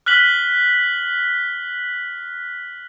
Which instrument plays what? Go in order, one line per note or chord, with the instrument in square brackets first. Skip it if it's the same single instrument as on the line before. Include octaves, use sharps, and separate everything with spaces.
[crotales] F6 F#6 B6 F#7 G7